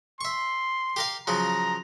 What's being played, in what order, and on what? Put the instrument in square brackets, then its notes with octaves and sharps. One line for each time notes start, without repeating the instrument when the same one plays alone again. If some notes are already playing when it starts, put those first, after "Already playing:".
[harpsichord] E5 C#6 [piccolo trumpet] C6
[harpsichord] G4 A#4 F5
[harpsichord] C#3 F3 F#3 [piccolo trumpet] A#5